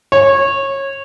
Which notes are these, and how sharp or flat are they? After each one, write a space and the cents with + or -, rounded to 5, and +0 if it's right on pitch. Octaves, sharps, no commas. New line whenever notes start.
C#5 -20